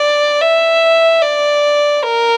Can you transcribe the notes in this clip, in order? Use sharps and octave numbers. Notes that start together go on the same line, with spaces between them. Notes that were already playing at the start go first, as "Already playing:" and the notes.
Already playing: D5
E5
D5
A#4